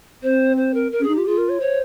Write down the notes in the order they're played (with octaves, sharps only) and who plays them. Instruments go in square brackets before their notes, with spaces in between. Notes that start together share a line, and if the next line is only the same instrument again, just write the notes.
[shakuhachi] C4 [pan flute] C5
[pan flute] C5
A#4
A#4
[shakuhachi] C#4
[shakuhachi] D#4 [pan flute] G#4
[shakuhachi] F4 [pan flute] G4
[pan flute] F4 [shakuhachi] G#4
[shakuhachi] A#4
C#5
[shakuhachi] C5 [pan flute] C#5